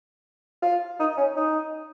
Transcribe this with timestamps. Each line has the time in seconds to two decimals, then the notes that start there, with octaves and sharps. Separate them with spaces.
0.62 F4
1.00 D#4
1.17 C#4
1.36 D#4